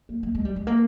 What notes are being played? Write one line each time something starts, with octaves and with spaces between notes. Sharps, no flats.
A#3
A#3
G#3
G3
G#3
A#3